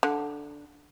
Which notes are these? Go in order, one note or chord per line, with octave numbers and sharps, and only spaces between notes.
D3